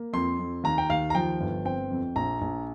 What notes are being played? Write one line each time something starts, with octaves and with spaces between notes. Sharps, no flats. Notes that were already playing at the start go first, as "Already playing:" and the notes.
Already playing: A#3
F2 C6
F2
D#2 A#5
G5
D#2 F5
A#5
F3 G5
G1
C4 G5
F2
A#1 A#5
A#1